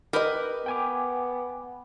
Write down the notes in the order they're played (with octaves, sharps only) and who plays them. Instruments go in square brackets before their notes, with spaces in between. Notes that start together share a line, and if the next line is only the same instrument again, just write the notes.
[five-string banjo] G4 D#5 [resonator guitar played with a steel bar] A#4 B4
[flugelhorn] B3 [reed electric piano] G5 G#5 D6